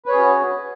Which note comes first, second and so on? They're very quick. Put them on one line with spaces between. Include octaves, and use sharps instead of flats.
B4 C#5 G#4 C#4 F#4